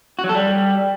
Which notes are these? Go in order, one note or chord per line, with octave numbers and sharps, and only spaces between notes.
F#4
F#3
A4
G3